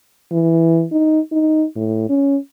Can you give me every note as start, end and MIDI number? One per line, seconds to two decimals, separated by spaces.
0.32 0.85 52
0.92 1.20 63
1.32 1.65 63
1.76 2.07 45
2.10 2.37 61